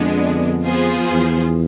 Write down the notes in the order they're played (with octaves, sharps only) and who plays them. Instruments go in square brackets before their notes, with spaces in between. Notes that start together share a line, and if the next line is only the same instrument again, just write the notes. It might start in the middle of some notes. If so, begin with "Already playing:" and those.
Already playing: [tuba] F2 [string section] D3 G#3 B3 D4
[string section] F3 B3 F4 G#4 C5
[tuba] E2